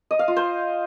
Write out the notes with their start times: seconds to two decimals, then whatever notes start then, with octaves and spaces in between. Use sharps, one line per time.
0.11 D#5
0.19 F5
0.28 F4
0.37 C5